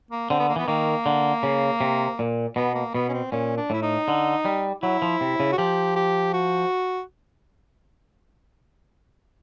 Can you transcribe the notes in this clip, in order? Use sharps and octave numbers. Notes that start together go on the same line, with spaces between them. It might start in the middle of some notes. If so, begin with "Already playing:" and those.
A#3
D3 C4
B3
A#3
E3 B3
D#3 A#3
D3
C#3
C3
A#2
B2 B3
A#3
B2 B3
C#4
C4
A#2 C#4
D4
A2 E4
D#4
D3
G3
F#3 E4
F3
C3
C#3
F#4
F3 G4
G4
F#4